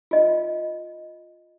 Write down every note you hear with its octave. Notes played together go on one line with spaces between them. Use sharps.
F4 D#5